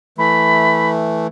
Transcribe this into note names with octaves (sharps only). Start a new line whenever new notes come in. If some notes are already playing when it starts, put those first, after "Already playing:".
E3 A3 B5